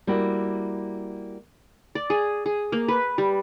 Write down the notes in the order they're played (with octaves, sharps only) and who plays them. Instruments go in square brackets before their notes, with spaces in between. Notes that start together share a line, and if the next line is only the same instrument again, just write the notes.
[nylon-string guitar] G3 A#3 E4 F#4
[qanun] D5
G#4
G#4
A#3
B4
G3